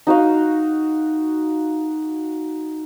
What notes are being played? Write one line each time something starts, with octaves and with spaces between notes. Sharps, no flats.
D#4 F#4 D#5 F5